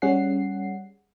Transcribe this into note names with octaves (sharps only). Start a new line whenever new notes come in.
G3 C#4 G#4 F#5 C7